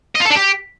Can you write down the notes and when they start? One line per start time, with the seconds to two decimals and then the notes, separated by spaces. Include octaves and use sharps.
0.15 D#5
0.20 F4
0.25 A4
0.30 D4
0.35 G4